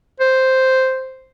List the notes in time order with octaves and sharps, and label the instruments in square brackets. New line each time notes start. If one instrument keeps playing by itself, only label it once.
[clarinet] C5